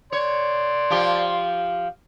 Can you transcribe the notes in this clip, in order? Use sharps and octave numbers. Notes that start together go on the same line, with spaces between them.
C#5 D5 C6
F3 F4 G4